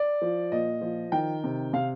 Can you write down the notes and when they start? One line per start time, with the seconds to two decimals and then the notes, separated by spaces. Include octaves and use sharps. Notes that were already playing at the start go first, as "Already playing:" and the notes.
Already playing: D5
0.22 F3
0.52 A#2 D#5
0.81 F3
1.12 D#3 G5
1.44 C3
1.73 C3 F5